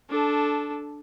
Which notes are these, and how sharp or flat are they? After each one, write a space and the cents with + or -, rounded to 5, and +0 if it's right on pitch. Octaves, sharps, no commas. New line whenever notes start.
D4 +0 A4 -10